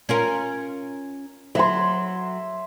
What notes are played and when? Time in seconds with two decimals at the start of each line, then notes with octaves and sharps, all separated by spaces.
0.09 C#4 F4 A#4
1.55 F#3 E5 C6